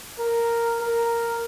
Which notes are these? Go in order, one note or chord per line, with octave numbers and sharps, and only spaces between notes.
A#4
A#4